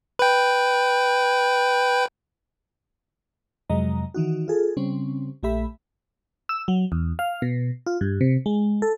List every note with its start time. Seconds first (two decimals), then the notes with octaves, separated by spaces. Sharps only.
0.19 B4 G5
3.70 F2 C3 F#3 G#3 D#5 A#5
4.14 D#3 E3 D#4 F#4
4.48 F4 G#4 A4
4.77 C#3 G3 C4 C#4
5.43 A#1 A3 G4 E5 B5
6.49 E6
6.68 F#3
6.92 E2
7.19 F5
7.42 B2
7.86 F4
8.01 G2
8.21 C3
8.46 G#3
8.82 A4